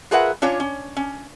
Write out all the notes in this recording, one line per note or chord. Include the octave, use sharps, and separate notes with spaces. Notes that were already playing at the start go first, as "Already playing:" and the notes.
F4 G#4 A#4 B4 E5 F#5
C#4 D4 F4 C#5
C#4
C#4